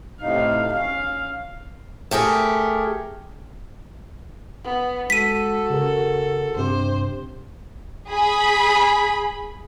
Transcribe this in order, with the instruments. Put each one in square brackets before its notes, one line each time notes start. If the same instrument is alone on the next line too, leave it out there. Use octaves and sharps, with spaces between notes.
[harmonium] A2 C3 D#4 [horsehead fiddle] F5
[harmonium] C#4 [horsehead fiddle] F5
[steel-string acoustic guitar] A3 G4 G#4 A#4
[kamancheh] B3
[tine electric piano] G#3 [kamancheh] F#4 A4 [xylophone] B6 D#7
[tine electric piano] C#3 G#4 A#4
[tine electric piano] G2 C3 G4 [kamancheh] C5
[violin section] G#4 B5